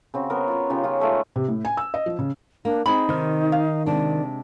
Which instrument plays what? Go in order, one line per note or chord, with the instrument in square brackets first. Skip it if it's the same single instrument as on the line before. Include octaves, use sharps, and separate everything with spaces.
[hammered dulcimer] C#3 C4 F#4
B3 A#4
F4 C#5
C#3 D#4 F4 G4
C#4 F4
G#3 A3 D#4 F4
[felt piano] C3
A2
G#5
E6
D#5
F3
C#3
[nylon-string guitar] A#3 [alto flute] D4
[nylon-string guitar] C4 G#4 [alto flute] D#4 [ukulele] B5
[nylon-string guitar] C3 [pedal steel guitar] D#3 F6
[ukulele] F5
[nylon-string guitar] C3 G#3 D4 [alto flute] D5